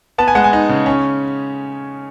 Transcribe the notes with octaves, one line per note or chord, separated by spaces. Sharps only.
B3 A5
G#5
G#3 F#5
G#5
D#4
C#3
C#4